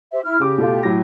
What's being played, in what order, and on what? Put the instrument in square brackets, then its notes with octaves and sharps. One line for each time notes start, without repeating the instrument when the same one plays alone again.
[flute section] G4 C5 E5
E4 F6
[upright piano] C#3 D6 [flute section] G4
[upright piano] B2 A3 F4
A2 F#3 A#6